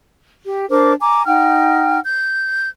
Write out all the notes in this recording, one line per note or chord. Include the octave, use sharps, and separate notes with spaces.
G4
D4 A#4 C5 D6
G#5 A#5 D6
D#4 F#5 G5 F6
G6